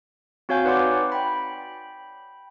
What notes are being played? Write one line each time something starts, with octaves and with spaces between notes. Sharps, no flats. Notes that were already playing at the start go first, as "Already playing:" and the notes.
C4 F#4 C#5 F5 G#5 G6
D#4 B4 D5 F#5 C6 D6
G5 B5